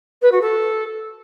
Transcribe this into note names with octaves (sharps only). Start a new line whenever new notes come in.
B4
F#4
A4